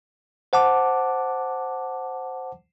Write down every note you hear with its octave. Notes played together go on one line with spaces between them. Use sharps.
C5 F#5 A5 D6